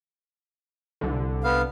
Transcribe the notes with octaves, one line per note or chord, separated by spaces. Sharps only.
C2 D3
B3 F5